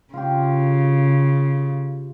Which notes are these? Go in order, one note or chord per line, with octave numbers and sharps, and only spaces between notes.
C#3 F4 G4